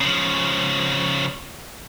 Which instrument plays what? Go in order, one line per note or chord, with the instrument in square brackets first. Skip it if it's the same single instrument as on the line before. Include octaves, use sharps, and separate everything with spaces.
[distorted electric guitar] C#3 F3